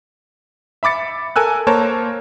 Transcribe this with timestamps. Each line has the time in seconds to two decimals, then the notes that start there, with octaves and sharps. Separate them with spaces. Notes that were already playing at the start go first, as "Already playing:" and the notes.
0.83 E5 B5 D6 A6 C#7
1.36 A4 A#4 G#5 E6 F#6
1.67 A#3 A#4 C5 C#5 A5